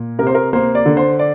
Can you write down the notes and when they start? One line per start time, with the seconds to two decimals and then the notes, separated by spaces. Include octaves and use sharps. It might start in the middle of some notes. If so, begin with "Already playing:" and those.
Already playing: A#2
0.19 C3 A#4
0.27 C5
0.35 A#4
0.53 A#3 C5
0.75 D5
0.86 D3
0.97 C5
1.19 D5